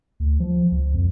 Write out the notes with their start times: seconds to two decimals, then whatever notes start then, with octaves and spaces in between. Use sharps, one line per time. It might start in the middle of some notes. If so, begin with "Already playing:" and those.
0.20 D2
0.40 F3
0.72 C#2
0.95 F2